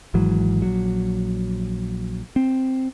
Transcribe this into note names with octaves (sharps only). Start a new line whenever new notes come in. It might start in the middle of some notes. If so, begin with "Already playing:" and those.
G#1 G#2 E3 F#3
A#1 F#3
C4